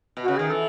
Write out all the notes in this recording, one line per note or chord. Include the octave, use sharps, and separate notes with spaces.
B2
C#3 F#4
D#3 G#4
E3 A4